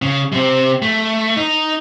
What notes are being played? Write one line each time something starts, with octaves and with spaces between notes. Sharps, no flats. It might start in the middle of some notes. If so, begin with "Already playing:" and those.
C#3
C3 C4
A3
D#4